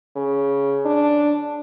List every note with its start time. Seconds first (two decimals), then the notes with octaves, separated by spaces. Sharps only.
0.16 C#3
0.86 D4